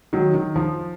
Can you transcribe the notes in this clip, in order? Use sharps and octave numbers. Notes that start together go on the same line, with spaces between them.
D#3 F#3
D#3
F3